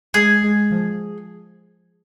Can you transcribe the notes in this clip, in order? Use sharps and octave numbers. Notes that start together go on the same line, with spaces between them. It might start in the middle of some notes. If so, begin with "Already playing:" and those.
G#3 G#4
G#3
F3